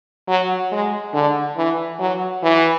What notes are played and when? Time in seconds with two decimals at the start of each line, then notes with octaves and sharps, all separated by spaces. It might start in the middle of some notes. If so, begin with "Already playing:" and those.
0.28 F#3
0.72 G#3
1.14 D3
1.57 E3
1.99 F#3
2.43 E3